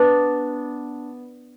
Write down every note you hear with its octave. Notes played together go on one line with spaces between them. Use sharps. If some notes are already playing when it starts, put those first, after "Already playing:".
Already playing: B3 D4